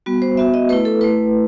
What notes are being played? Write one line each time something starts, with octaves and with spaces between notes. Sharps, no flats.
G3 B3 F#4
C5
B3 F#4 E5
D#5
A3 E4 B4
A4
A3 E4 B4